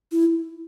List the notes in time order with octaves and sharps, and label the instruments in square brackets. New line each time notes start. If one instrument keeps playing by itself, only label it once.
[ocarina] E4